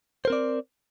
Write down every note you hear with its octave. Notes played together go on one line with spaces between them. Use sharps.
C4 A#4 C5 D5